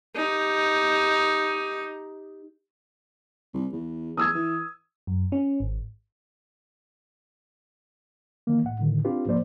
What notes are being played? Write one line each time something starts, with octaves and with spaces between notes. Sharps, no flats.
D#4 G4
C2
E2
E2 D#6 E6 G#6
E3
F#2
C#4
G#1
D#3 E3 A#3
C2 A2 F#5
A2 D3 D#3
C4 D4 F4 G4 B4
C2 G#2 F3 A#3 C5 D5